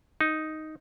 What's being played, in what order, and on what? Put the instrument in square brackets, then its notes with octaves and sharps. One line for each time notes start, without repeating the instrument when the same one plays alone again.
[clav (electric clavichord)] D#4